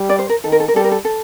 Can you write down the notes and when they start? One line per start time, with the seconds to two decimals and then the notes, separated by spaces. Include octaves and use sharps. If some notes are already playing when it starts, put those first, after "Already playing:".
Already playing: G3
0.09 D5
0.19 C5
0.29 A#4
0.44 D#3 A4
0.52 A#4
0.60 A4
0.68 A#4
0.75 G3 A4
0.84 A#4
0.92 A4
1.05 A4